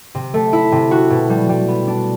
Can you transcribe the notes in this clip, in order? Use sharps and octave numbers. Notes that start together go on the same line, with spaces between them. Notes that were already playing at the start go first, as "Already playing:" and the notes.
C3
A3
E4
C3
F#4
B2
G3
G3
B3
D4